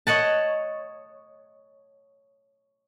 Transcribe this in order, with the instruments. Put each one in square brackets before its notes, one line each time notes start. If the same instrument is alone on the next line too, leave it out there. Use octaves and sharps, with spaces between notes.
[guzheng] C#5 D#5 F#5 A5